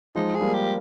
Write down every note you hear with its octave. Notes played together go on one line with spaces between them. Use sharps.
F3 G#3 D#4
G#4
G3 A#3
G4